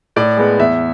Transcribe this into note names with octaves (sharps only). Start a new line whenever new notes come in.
A2 D5
G#3 B3
E2 E5